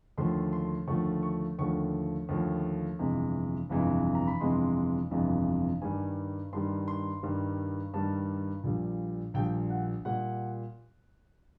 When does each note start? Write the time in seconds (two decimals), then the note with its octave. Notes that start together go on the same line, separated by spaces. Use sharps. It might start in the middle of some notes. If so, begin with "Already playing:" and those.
0.18 D#2 D3 F3 A3 C6
0.53 C6
0.87 D#2 D3 F3 A3 C#6
1.23 C#6
1.59 D#2 D3 F3 A3 C#6
2.29 D#2 D3 F3 A3
2.99 G1 F2 C3 E3 G#3
3.69 G1 F2 C3 E3 G#3
4.15 A#5
4.27 B5
4.40 G1 F2 C3 E3 G#3 C6
5.11 G1 F2 C3 E3 G#3
5.82 G2 D#3 G3 G#5
6.53 G2 D#3 G3 C6
6.88 C6
7.23 G2 D#3 G3
7.93 G2 D#3 G3 A5
8.64 A#1 A#2 G3
9.34 A#1 A#2 G3 G5
9.70 F#5
10.05 A#2 G3 F#5